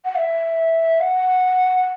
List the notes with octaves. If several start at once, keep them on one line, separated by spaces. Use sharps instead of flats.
F#5
E5
F#5